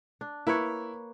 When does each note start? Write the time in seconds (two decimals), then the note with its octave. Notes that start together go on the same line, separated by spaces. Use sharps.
0.21 D4
0.47 A#3 E4 B4 C#5